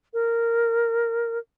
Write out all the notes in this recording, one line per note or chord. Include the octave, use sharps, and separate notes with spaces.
A#4